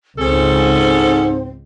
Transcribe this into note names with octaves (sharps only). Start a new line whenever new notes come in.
C#2 G#2 C4 C#4 G#4 A4